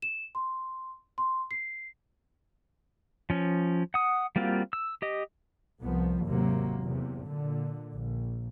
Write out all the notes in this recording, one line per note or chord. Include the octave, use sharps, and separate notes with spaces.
E7
C6
C6
C7
F3 C#4
F#5 D#6
G3 A#3 C4 F4 F#4
E6
G4 D#5
C2 F3 B3
G#1 D#2 C3 F#3 A#3
E2 C3
A#2 D3
A#1